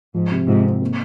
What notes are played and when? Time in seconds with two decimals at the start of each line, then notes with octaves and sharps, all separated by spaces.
0.14 G#2 F3
0.32 C3
0.48 G#2 C3 F4
0.65 C4
0.82 A#3